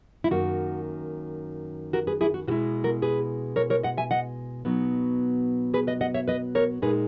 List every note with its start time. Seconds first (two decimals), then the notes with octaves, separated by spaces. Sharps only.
0.24 E4
0.31 F#2 D#3 A#3 F#4
1.93 F#4 A#4
2.07 G#4 B4
2.21 E4 G#4
2.34 F#4
2.47 B2 G#3 B3 E4 F#4
2.84 F#4 A#4
3.02 G#4 B4
3.56 A#4 C#5
3.70 A#4 C#5
3.83 D#5 F#5
3.97 E5 G#5
4.11 D#5 F#5
4.65 B2 F#3 B3 D#4
5.74 G#4 B4
5.87 B4 D#5
6.01 D#5 F#5
6.14 C#5 E5
6.28 B4 D#5
6.55 A#4 C#5
6.82 A#2 G#3 D#4 G#4 B4